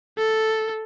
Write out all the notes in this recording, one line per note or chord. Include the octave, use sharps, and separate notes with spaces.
A4